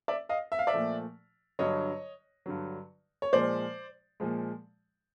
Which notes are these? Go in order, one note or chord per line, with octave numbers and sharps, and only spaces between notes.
D5 E5
D#5 F5
E5
F5
D5 E5
A#2 F3 A3
G2 D3 F#3 C#5 D#5
G2 D3 F#3
C#5
A#2 F3 G#3 C5 D5
A#2 F3 G#3